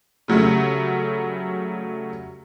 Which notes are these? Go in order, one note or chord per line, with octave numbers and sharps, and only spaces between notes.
C#3 F#3 G3 A3